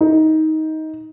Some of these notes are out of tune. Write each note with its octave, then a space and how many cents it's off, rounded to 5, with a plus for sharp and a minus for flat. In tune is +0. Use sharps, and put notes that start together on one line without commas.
D#4 +15